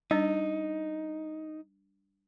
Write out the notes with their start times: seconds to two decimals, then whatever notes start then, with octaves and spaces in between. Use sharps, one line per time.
0.11 G3 D4 D#4 D#5